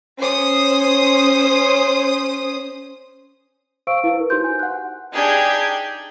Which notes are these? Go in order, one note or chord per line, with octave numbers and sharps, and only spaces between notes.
C#4 C5 D#6
C5 F5 C#6 E6 D7
E4 B4 F5
A#4 B4
D#4 F#4 G4 C5 C6 G6
G#5
F#5 F#6
D4 D#4 G4 G#4 G6 G#6